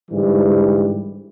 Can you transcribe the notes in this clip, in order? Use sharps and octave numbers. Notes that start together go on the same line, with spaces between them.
G#2 D3 E3 G3